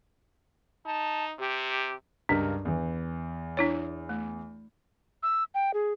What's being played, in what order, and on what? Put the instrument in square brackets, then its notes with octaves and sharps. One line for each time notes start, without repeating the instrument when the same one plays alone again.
[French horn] D#4 [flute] A5
[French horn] C3 [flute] G4
[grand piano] C#2 G2 A#4 [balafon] D4
[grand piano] E2 E3
[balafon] D4 E4 C#5
A3
[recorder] E6
G5
G#4